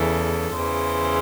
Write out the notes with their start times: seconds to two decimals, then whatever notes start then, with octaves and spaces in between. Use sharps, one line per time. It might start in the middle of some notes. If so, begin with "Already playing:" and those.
Already playing: E2 C#3 E3 A4
0.54 E2 C#3 E3 C5